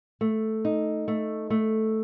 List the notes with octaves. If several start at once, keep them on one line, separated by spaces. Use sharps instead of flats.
A3
D#4
A3
A3